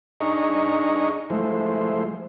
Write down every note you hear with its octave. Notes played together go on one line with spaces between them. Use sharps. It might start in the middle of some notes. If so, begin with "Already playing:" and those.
D4 D#4 G#4 D#5 A#5 C#6
F3 G#3 A3 E4 C5